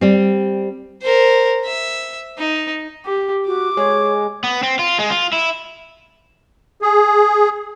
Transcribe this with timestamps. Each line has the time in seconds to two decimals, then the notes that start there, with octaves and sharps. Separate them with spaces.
0.01 G3 C4
1.02 A#4 C5
1.65 E5
2.38 D#4
3.06 G4
3.47 F#4 D6
3.77 G#3 C#5
4.44 B3
4.63 C4
4.79 F4
4.99 G#3
5.10 F4
5.33 E4
6.82 G#4